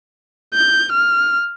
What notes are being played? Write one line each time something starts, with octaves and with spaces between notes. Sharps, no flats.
G6
F6